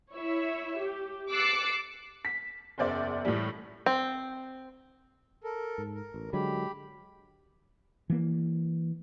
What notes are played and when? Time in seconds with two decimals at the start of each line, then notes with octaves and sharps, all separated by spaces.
0.12 E4 C#5 E5
0.78 G4
1.31 D6 E6 F#6 A6 C7 C#7
2.25 B6
2.78 F#1 E2 C5 D5 E5
3.25 A2 E3 G3
3.86 C4
5.44 A4 A#4
5.78 G#2
5.94 A#4
6.14 A1
6.33 D3 F#3 G#3 G4 B5
8.10 E3 A#3